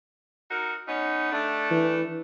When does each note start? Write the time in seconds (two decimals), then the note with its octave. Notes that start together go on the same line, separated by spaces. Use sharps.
0.51 D#4 F#4 A#4
0.87 B3 C#4 D#4
1.32 A3 D4
1.71 E3